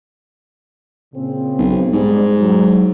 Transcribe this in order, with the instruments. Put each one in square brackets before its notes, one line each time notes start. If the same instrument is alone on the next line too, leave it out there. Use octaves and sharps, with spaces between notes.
[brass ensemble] A#2 C#3 C4
[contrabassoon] B1
[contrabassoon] G#2 [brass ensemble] G3
[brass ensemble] F#3